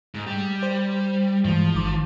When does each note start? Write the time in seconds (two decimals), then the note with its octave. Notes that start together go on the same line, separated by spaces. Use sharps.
0.15 G#2
0.27 G3
0.63 C5
1.45 G2 E3 F3 G#3
1.75 G#1 D#3 D6